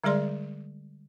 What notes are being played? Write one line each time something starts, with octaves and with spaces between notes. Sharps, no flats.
D3 G3 G#3 G#4 D5 C6